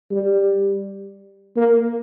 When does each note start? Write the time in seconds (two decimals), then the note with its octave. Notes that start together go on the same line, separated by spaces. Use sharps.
0.11 G3
1.56 A#3